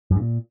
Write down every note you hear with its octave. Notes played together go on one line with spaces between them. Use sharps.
F#2
G2
A#2